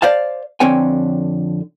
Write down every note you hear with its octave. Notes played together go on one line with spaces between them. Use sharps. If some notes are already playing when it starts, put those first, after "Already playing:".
C5 D5 F5 A5
F2 D3 C4 C#5 G5 G#5